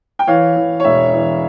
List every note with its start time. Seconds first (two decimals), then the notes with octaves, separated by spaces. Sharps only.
0.19 G5
0.27 E3 C#5 F5
0.56 E3
0.80 C#5
0.84 E1 E5
1.13 E3